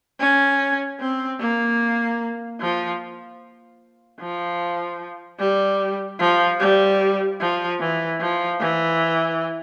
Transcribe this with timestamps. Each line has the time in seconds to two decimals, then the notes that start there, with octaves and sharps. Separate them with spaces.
0.20 C#4
1.00 C4
1.40 A#3
2.60 F3
4.20 F3
5.39 G3
6.19 F3
6.60 G3
7.40 F3
7.80 E3
8.20 F3
8.60 E3